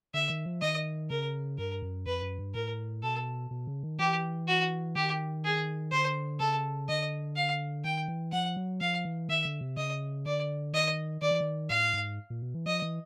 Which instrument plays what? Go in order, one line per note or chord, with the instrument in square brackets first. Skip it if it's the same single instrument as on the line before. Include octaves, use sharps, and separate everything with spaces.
[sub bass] D3 [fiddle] E5
[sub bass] D#3
F3
[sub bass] D#3 [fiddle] D#5
[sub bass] C#3 [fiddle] A#4
[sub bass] G2 [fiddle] A#4
[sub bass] F#2
[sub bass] F2 [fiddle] B4
[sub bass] F#2
G2
[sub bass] A2 [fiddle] A#4
[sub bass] B2 [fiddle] A4
[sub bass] B2
C#3
D#3
[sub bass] E3 [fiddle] G4
[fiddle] F#4
[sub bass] D#3 [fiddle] G4
[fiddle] G#4
[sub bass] D3 [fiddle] C5
[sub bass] C#3 [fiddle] A4
[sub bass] D3 [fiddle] D#5
[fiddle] F5
[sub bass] D#3 [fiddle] G5
[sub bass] E3
[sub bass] F3 [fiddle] F#5
[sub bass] F#3
[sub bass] F3 [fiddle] F5
[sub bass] E3
[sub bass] D#3 [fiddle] E5
[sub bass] D3
C3
[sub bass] C#3 [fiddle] D#5
[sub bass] D3 [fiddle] D5
[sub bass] D#3 [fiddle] D#5
[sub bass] D#3 [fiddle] D5
[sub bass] E3
D#3
[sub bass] A2 [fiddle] F5
[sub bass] G#2
A#2
B2
E3
[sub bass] F3 [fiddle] D#5
[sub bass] E3